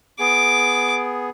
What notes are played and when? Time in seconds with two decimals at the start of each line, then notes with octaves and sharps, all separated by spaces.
0.19 B3 G#4 D6